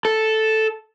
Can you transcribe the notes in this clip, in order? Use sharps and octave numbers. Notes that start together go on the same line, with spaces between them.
A4